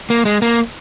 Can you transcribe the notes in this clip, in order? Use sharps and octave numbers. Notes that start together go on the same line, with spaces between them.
A#3
G#3
A#3